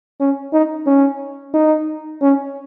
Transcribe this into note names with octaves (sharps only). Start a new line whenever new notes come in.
C#4
D#4
C#4
D#4
C#4